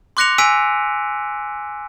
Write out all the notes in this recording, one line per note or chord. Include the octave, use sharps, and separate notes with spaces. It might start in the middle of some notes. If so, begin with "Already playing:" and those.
C6 D6 F#6 A#6 C#7 F7
G#5 E6 B6 D7 D#7